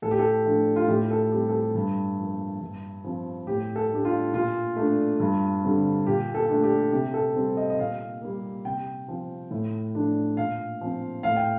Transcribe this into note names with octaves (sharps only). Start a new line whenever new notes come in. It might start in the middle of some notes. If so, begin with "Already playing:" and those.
A2 A4
G4
A4
F3 A3 D4
F4
A2 G4
A4
G3 C4 G4
A4
G4
G2
F3
A#3
G2
F3 C4
A2 G4
A4
A3 D4 G4
F4
A#2 F4
A3 D4
G2
D3 G3 C4
A#2 G4
A4
A3 D4
G4
C3 G4
A4
G3 C4
D#5
D#5
A#2 F5
G3 A#3
C3 G5
F3 C4
A2
F3 A3 D4
A#2 F5
F3 C4
A2 F5
G5